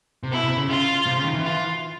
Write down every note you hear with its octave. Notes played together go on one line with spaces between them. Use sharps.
C3
B2 E4
C3
C#3
C#3 F4
C3
C#3
D#3
E3
F4